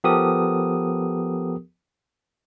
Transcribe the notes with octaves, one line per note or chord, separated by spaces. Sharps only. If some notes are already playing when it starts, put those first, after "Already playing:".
F3 B3 G4 A4 A#4 D#6